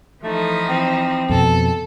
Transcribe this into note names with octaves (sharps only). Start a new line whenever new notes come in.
E3 F3 A3 D#4
C4
F2 B2 A4